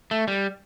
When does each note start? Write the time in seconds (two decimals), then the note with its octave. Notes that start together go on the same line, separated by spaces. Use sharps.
0.11 A3
0.28 G3